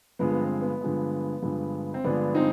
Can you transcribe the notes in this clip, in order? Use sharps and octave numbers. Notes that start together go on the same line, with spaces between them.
G2 D3 F3 G#3 B3
B3
C4
B3
G2 D3 F3 G#3
G2 D3 F3 G#3
C4
G2 D3 F3 G#3 B3 D4
C4 D#4